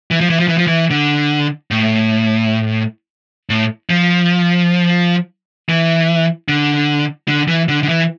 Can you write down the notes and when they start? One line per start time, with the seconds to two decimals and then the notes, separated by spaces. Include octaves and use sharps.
0.11 E3
0.21 F3
0.30 E3
0.39 F3
0.48 E3
0.58 F3
0.67 E3
0.91 D3
1.71 A2
3.50 A2
3.90 F3
5.69 E3
6.48 D3
7.28 D3
7.48 E3
7.68 D3
7.83 D3
7.88 E3